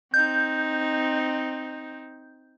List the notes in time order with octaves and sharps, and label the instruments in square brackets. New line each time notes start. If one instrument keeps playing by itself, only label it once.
[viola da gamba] C4 D#4 [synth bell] G6